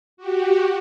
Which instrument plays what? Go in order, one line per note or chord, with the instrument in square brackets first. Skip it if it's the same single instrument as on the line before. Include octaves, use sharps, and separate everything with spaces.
[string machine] F#4 G4